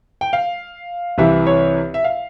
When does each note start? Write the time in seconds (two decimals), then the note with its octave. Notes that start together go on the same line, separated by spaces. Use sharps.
0.21 G5
0.33 F5
1.18 C2 C3 E3 E5
1.46 C#5
1.94 E5
2.04 F5